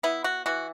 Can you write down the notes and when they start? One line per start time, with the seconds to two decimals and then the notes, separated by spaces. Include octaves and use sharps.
0.03 B3 E4
0.24 F#4
0.46 E3 F#4